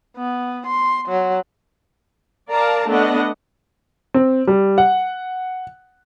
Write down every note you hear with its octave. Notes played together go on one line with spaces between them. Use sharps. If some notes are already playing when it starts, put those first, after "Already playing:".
B3
C6
F#3
A#4 D5 F5 A5 A#5
A3 B3 D4 D#5 F#5
C4
G3
F#5